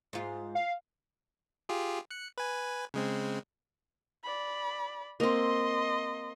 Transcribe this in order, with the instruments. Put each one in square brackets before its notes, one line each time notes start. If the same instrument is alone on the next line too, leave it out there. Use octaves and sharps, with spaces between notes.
[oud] G#2 F4
[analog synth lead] F5
[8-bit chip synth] F4 G4 G#4
F#6 C#7
B4 G#5
C#3 G#3 C4
[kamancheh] D5 B5
[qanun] A#3 C4 [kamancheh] D#5 C6